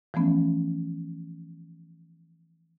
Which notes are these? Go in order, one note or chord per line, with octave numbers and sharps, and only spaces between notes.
E3 F3 A3 B3 C#4